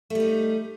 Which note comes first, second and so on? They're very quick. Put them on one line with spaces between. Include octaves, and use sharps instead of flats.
A3 G3 D#4